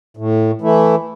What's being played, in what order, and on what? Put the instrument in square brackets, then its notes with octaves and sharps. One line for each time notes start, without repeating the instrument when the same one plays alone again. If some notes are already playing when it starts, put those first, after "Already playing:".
[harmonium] A2
E3 A3 E4